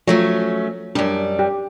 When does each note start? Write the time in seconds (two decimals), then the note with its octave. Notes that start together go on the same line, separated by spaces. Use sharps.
0.07 F3 F#3 A3 C#4
0.95 F#2 G3 D4
1.39 G4